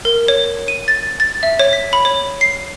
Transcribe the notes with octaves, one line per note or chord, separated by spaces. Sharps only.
A#4
C#5
D#7
A6
A6
E5
C#5
B6
B5
C#5
C7